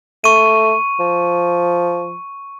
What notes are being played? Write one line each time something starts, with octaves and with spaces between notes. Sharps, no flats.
A3 C#6 D#7
F3